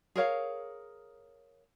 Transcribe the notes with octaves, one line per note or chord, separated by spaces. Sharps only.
G#4 A#4 C#5 F5